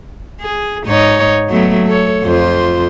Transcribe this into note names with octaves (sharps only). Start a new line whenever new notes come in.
G#4
G#2 D#4 C#5
F#3 A3 B3
A4 C#5
F2 F4 C5